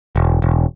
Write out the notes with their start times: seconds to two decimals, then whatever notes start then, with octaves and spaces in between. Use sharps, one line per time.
0.16 E1
0.42 E1